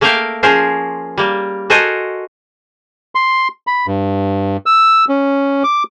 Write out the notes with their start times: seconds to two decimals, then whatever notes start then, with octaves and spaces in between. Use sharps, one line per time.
0.01 A3 A#3 A#4 E5 F5 G5
0.43 F3 C#4 G#4 A#4 C5
1.18 G3 A#3
1.70 F#4 A4 A#4 C5 D#5 G#5
3.15 C6
3.67 B5
3.87 G2
4.66 E6
5.09 C#4
5.64 D6